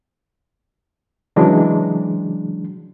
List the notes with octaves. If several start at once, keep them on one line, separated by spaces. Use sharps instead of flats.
C#3 E3 F#3 G#3 D4